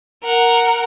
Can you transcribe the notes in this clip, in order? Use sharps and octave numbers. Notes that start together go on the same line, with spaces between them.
A#4 F#5